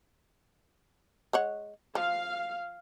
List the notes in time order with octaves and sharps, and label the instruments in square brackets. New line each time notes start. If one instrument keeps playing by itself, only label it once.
[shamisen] G#3 C#5 F#5
[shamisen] F3 [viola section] F5